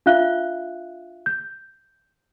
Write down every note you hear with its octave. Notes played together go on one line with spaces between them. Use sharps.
D4 F4 E5 F5 F#6 G7
G6